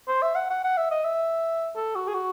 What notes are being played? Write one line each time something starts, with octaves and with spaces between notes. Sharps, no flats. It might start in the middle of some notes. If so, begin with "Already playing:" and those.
C5
E5
F#5
F#5
F#5
E5
D#5
E5
A4
F#4
G#4
F#4